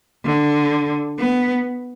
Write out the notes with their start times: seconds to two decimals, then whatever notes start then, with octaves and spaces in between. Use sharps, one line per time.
0.25 D3
1.19 B3